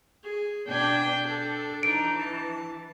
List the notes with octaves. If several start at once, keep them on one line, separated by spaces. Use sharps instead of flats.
G#4
B2 B3 D4 G5 G#5
D4 A4
E3 D4 D#4 D7
A5